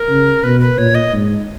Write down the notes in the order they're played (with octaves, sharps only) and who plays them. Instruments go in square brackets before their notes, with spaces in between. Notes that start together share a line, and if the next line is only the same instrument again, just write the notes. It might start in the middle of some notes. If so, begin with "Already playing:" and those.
Already playing: [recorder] A#4
[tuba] C#3
[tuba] B2 [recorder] B4
[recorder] B4
[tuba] A#2 [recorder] C#5
[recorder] D#5
[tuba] G#2